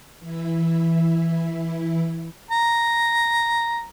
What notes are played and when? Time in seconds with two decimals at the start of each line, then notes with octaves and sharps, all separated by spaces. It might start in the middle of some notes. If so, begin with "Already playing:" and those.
0.19 E3 E4
2.51 A#5